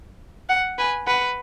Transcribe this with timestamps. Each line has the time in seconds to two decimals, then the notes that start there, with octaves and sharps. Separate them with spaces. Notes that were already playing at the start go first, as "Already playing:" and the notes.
0.49 F#5
0.78 B4 G#5
1.07 B4 F#5